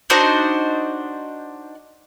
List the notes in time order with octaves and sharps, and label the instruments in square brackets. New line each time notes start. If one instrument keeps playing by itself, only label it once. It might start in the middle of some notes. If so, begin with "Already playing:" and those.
[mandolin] D4 D#4 F#4 C5